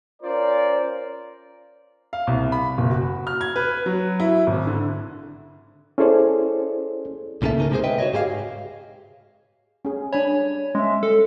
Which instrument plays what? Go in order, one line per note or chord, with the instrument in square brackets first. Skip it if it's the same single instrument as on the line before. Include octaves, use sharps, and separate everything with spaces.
[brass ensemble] C#4 F4 A#4 C5 D5
[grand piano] F5
C2
B5
F#1
F#4
F6
G#6
B4
F#3
E4
G#1
D3
[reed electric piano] C#4 E4 G#4 A4 C5 D5
[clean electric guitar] C#2 A2 C#3 A#3 A4 E5
C#3 D#4 A#4
C3 G#3 C4 F#4 G#4 C5
B4 D#5 E5 G5
F#4 G#4 C#5 D#5
G#2 G4 G#4 B4 F5
[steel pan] C#4 G#4
[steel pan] D4 G#5 B5 [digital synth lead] C#5
[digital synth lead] G#3 [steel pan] C#4 E5
[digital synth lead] A4